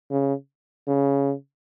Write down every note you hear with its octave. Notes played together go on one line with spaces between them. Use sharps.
C#3
C#3